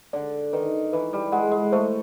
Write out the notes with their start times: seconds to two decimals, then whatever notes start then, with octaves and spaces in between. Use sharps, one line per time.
0.13 D3 D5
0.53 D#3 B4
0.93 E3 B4
1.13 G3
1.32 G#3 F#5
1.52 G#3
1.72 A3 C5